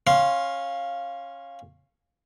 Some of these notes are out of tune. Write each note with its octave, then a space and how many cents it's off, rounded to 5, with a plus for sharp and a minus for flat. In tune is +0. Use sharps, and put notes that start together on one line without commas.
C#4 -15 F5 +0 C6 +0